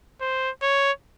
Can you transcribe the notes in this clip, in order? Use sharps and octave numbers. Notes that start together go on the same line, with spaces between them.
C5
C#5